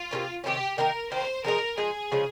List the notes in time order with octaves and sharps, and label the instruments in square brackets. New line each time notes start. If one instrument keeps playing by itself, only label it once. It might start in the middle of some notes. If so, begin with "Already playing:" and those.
Already playing: [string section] F4
[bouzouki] C3 D#3 A#3 C#4
[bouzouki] C3 D#3 A#3 C#4 [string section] G4
[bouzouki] D#3 A#3 D#4 [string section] A#4
[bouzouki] D#3 A#3 D#4 [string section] C5
[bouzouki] F3 G#3 D#4 [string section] A#4
[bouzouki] F3 G#3 D#4 [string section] G#4
[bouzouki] C#3 F3 G#3 C#4